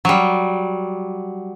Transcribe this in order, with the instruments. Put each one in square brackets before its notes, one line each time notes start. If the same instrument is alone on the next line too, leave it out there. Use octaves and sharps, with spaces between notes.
[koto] F#3 G3